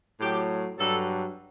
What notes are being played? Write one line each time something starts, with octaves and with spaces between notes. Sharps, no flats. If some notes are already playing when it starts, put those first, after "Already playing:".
A2 F#3 G4
G2 F#3 A4